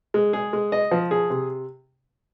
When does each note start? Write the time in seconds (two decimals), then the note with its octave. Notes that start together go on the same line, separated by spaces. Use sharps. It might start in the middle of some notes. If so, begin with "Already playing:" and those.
0.14 G#3
0.33 G#4
0.53 G#3
0.72 D#5
0.91 F3
1.11 G#4
1.30 C3